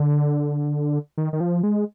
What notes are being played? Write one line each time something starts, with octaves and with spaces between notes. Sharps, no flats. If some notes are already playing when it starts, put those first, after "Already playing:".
Already playing: D3
D#3
D#3
F3
G#3